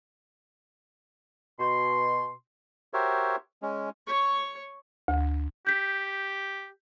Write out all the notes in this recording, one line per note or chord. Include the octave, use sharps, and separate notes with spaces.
B2 C6
F#4 G4 A#4 C5 C#5 E5
G#3 C#4
C#5 C#6
D2
G4 G6 B6